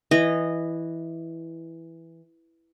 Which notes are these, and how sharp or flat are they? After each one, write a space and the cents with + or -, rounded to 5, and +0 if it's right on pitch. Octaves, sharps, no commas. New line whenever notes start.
E3 +0 D#5 -15